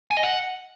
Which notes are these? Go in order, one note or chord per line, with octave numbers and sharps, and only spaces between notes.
G#5
D#5
F#5